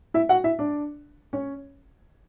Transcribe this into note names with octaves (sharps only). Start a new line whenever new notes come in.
E4 E5
F#4 F#5
E4 E5
D4 D5
C#4 C#5